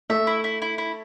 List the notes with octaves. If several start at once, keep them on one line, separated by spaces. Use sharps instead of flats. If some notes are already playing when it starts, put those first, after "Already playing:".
A3 E5
E4
E4
E4
E4